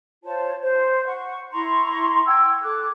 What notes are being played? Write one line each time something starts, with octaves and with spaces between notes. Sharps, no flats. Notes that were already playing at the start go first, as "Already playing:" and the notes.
F4 C5 C#5 A5
C5
F#5 C#6
E4 A#5 C6 C#6
F#5 G5 E6 G#6
A4 D6 F#6